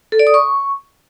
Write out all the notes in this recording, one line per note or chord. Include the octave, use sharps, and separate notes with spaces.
A4
D5
D#6
C#6